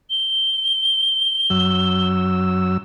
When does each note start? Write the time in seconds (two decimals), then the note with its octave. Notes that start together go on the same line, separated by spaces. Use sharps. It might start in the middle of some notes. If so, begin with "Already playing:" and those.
0.10 G7
1.50 F#2 F#3 E6